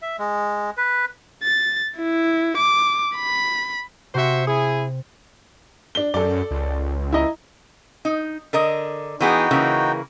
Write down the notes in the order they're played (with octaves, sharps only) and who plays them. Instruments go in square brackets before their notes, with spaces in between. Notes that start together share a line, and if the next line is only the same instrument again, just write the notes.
[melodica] E5
G#3
B4
[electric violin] A6
E4
D6
B5
[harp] C3 C6 C#7 [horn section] F#4 C5 E5
[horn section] E4 G#4
[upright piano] D4 G7
[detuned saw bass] F#2 [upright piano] A4 D5
[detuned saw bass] C#2
[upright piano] E4 D#5 A#5
[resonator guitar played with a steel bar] D#4
D3 A#4 D#5
[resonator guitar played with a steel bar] E3 B3 G#4 [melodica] D#4 F#4 G5
[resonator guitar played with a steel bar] C#3 E3 A#3